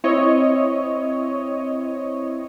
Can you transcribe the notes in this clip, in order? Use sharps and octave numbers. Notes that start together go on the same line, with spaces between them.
C4 E4 C#5 D#5